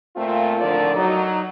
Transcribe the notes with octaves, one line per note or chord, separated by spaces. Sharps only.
A#2 A3 C4 F4
A2 D3 D#3 F3 A#4 D5
F#3 D#4